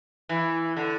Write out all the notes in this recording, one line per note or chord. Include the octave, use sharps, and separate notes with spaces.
E3
D3